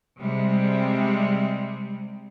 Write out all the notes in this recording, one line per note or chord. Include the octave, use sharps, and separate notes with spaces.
C3 G3 G#3